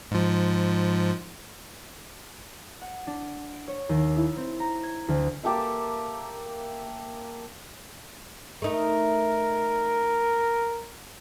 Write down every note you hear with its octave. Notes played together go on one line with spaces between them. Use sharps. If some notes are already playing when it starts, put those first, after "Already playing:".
G#2 F3
F#5
D4
D7
C#5
D#2
E4
C4
A#5
G#6
D2
A#3 G4 A4 E5
A3 D#4 A#4